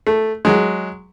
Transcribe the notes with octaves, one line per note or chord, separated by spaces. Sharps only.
A3
F#3 G#3